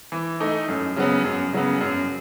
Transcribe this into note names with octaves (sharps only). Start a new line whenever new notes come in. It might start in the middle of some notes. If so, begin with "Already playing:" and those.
E3
A3 D#4
F#2
C#3 F#3 B3
F#2
C#3 F#3 B3
F#2